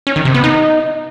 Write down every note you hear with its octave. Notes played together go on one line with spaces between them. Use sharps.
C#4
D#3
C3
B3
D#4